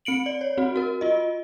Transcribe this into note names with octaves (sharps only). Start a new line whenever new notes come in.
C4 C#7 D7 F#7
D5
C#5
C4 F#4
F#4 A#4
F4 D#5